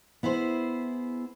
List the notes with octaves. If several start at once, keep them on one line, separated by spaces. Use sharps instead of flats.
B3 E4 G#4 C5